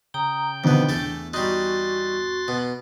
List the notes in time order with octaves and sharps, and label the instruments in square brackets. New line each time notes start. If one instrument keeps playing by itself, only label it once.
[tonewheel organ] C#3 G5 G6 [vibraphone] A#5 D#6
[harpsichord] F2 B3 [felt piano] B2 D3 D#3 [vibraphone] D4
[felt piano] E2 [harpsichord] A3 A4
[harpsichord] G3 D#4 [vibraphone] F#4 C#6 [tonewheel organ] C6 F#6 A6
[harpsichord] B2